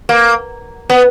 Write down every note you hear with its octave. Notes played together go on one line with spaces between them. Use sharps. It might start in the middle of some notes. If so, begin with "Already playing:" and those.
A#3
B3